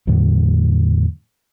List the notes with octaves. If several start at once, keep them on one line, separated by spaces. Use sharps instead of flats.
E2 A2 D3 F#3